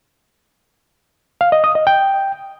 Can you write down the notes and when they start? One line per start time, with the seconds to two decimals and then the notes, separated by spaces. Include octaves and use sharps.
1.41 F5
1.52 D#5
1.64 D#6
1.75 D#5
1.87 G5